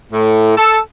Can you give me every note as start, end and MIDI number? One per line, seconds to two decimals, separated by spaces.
0.12 0.53 45
0.56 0.78 69